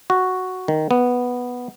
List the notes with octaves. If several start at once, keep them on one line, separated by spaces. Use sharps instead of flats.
F#4
D#3
B3